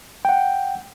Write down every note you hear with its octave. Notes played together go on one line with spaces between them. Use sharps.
F#5 G5